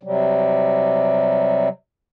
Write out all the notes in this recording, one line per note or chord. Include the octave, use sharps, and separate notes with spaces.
C3 F#3 G3